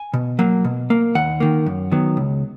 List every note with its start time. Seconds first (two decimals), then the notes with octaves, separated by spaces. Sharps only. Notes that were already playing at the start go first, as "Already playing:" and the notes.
Already playing: G#5
0.14 B2
0.39 F#3 A#3
0.64 B2
0.90 A#3
1.15 D#2 F#5
1.40 D#3 A#3
1.66 F#2
1.92 D#3 F#3 B3
2.17 C#2